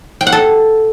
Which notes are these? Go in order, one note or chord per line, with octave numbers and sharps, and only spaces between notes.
G5
F#5
A4